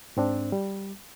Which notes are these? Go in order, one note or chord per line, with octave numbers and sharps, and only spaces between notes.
G#2 C4 D4
G3